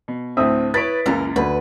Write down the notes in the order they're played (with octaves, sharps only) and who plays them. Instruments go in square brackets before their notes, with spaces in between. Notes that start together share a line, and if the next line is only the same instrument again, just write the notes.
[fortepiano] B2
[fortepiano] D2 A2 E5 [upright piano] C4 D#6
[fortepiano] E4 C#5 [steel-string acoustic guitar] B4 [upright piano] A6 B6 D7
[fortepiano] C#2 F#2 A#3 [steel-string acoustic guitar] E3 A#4
[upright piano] D2 [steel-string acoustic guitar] B4